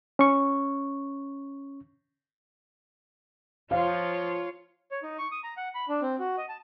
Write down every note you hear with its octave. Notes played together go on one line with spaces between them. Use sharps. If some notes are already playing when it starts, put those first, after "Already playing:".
C#4 C#6
F3 F4 C#5 F5
C#5
D#4
C#6
D#6
A#5
F#5
B5
D4
C4
F#4
D#5
A5